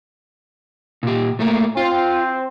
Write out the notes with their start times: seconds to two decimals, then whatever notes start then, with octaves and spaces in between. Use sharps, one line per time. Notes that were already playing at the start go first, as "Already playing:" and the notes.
1.03 A#2 G4
1.39 A2 A3 A#3
1.77 C4 F4